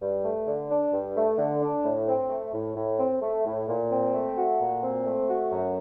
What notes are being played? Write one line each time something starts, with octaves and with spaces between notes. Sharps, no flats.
G2
A3
D3
D4
G2
A3
D3
D4
A2
C4
A3
A2
A2
C4
A3
A2
A#2
C4
A3
F#4
A#2
C4
A3
F#4
F#2